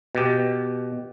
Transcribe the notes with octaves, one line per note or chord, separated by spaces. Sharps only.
B2 G4